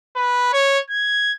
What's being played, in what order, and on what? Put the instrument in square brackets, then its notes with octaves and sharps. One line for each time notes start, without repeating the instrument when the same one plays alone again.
[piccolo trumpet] B4
C#5
G#6